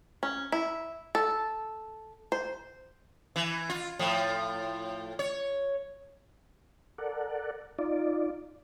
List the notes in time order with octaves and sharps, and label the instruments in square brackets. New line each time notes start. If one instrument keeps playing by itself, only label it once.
[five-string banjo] C#4
E4
A4
C5
[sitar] E3
F4
A2 F3
C#5
[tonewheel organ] A4 A#4 D5 F#5
D#4 F4 D5